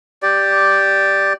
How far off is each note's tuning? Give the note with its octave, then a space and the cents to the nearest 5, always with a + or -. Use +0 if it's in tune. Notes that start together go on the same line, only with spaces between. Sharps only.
G4 +0 D5 +0